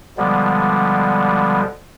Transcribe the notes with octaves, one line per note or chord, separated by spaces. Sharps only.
B2 D3 F3 G3 G#3 B3